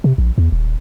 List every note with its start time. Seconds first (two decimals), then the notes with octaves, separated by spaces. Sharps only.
0.04 C3
0.18 A#1
0.38 E2
0.52 D#1